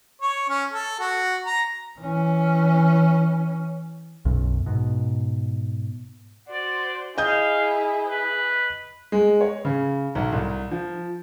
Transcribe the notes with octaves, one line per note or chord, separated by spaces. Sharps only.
C#5
C#4
A4
F#4
A#5
E3 C#4
B1 F#2
G#2 B2
F#4 C5 D5
E4 G#4 D#5 F5 D#6 G6
B4
G#3
C#5
C#3
B1
C2
F3